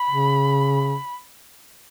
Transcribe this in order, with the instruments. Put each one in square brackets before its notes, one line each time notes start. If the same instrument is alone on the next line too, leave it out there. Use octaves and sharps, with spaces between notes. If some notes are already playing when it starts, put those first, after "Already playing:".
Already playing: [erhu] B5
[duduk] C#3